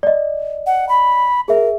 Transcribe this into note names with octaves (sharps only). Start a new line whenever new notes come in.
D5 D#5
F#5
B5
G#4 A#4 E5